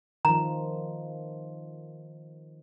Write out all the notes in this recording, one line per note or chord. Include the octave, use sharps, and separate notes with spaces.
D#3 F3 A#5